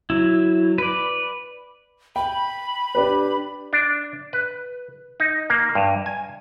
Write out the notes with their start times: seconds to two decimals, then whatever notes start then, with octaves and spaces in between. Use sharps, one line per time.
0.10 F#3 E4
0.78 B4 D5
2.16 G5 B5
2.95 D4 G4 B4
3.73 D4
4.33 B4
5.20 D#4
5.50 A#3
5.75 G2
6.06 G#5